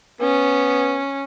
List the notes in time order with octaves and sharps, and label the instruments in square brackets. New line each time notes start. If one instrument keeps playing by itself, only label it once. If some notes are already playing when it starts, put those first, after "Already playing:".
[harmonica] B3 [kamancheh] C#4